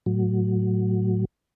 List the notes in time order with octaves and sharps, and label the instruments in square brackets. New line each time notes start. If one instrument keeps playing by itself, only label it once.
[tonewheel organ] A2 F#3